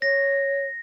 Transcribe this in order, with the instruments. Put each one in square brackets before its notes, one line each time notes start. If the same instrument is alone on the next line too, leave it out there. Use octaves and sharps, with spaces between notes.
[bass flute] C#5 [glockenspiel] A#6